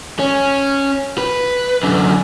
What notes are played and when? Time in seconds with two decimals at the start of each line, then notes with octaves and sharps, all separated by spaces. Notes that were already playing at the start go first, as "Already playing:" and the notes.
0.19 C#4
1.18 B4
1.83 F#2 D3